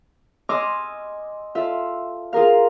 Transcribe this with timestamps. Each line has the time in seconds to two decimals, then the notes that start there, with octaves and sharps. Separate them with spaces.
0.49 D#5 G#5 C6 D6 E6 F6
1.55 F4 A4 E5
2.33 F4 G#4 A#4 F5